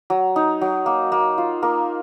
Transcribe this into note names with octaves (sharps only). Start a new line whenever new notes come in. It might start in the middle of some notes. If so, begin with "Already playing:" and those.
F#3
D#4
F#3
A#3
A#3
F4
A#3 A#4